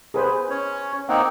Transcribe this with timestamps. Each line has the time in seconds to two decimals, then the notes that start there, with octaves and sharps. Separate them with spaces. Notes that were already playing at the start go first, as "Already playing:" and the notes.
0.14 G#4 B4 C5
0.50 C#4 C#5
1.09 A#3 C4 D#4 F#5